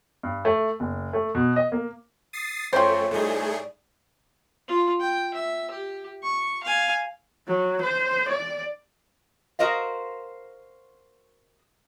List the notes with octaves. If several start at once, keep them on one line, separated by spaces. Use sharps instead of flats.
G2
A3
F#1
A3
B2
D#5
A#3
D#6 A6 C7
F#2 F3 A3 C#4 C5 G5 C6
A2 G3 A3 D#4 G#4 D5
F4
G5
E5
G4
C#6
F5 G#5
F#3
C5
D5
F#4 A#4 C5 D#5 F5